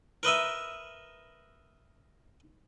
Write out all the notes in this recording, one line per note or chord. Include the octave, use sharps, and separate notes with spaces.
A#4 B4 D#5 E5